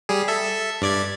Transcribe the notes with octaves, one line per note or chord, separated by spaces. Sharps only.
G3 G#4
A4 E5
G2 D5 G#6